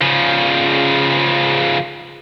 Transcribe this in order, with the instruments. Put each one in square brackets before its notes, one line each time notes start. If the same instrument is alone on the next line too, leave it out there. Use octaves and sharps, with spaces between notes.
[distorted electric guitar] C#3 F3